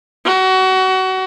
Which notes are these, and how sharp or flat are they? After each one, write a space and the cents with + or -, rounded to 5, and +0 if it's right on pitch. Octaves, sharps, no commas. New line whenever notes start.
F#4 +25